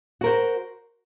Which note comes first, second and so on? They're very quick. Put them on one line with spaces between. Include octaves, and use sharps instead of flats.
F#4 A#4 C5